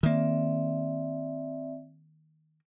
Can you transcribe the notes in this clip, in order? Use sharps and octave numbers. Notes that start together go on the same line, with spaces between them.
D#3 A#3 C4 D5 E5